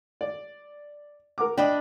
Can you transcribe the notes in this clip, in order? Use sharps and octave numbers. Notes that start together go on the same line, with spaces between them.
D5
A#4 F#5 D6
D4 D#5 G5 B5